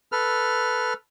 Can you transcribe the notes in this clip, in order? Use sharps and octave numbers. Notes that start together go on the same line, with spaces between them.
A4 B4 F6